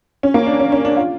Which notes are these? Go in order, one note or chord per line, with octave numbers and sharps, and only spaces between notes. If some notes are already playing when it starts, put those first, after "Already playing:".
C#4
A#3
D4
C#4
C#4
D4
F4